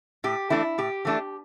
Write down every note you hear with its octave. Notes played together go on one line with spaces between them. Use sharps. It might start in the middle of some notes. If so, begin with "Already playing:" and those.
A2 G4
E3 A3 D4 E4
A2 G4
E3 A3 D4